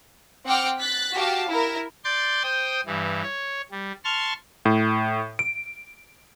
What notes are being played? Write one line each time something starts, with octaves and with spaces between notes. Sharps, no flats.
C4 F#5 G5 D6 F6
F#6 A6 B6
F#4 G4 F5 A5
E4 A#4
D5 C6 G6 A6
C5 G5 D#6
G2 E3
C#5
G3
A5 C6 C#6 F6
A2
D7